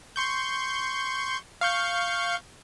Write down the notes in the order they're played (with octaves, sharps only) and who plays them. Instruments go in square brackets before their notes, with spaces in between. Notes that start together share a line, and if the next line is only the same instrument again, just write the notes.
[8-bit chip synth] C6 C#6 G6
F5 C#6 G6